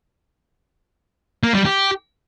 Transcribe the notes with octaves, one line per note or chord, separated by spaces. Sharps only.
A#3
G3
G4